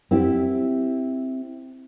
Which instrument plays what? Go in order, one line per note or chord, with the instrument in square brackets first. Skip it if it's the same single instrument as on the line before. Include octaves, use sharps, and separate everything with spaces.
[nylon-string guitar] C4 E4 G4